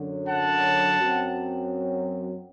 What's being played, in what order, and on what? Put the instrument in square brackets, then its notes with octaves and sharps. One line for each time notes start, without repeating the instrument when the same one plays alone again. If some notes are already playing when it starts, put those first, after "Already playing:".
Already playing: [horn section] F#2 D3 F#3
F#5 A5
F#2 F#3 C4